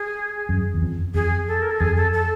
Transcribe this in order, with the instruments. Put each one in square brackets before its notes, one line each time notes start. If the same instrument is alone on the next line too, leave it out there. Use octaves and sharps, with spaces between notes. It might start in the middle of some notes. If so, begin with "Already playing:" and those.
Already playing: [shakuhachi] G#4
[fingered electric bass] F#2
E2
F2
[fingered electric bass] F2 [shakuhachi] G#4
[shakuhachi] A4
A#4
A4
[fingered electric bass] F2 [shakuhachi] G#4
[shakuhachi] A4
A4